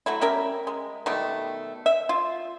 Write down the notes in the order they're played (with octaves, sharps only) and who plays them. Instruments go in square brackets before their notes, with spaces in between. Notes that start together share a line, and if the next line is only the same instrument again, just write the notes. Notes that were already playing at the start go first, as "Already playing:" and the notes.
[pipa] F#3 A3 E4
G3 C#4 A#4 E5
G#3
B2 D#3 G3 A3
E5
F4